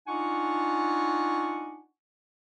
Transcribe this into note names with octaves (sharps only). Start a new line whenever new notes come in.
D4 D#4 F4 F#5 G#5 C#6